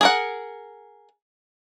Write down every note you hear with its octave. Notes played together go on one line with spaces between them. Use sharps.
G#4 A#4 F#5